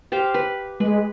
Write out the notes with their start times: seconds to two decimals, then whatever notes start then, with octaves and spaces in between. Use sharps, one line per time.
0.12 G4 C5 F5
0.34 B4
0.80 G#3 B4